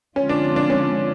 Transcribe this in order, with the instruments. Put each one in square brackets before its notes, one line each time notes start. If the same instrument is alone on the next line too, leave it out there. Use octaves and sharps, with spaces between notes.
[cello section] D3 F3 G#3 C4 F4 [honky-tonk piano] C#4
[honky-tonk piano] D4
D4
C#4